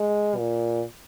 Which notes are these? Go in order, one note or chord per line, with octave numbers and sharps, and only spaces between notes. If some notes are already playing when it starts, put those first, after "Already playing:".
Already playing: G#3
A#2